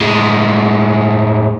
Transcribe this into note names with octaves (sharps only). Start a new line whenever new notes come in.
A2 G#3